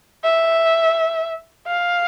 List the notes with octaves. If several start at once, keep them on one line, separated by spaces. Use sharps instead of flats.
E5
F5